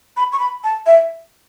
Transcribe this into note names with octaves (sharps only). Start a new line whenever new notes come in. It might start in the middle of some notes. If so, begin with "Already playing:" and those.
B5
C#6
B5
A5
E5